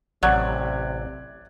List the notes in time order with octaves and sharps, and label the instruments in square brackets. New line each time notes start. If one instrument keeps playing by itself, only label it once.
[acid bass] A1 [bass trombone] C3 [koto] F#3 [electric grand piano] D5 F#6 G#6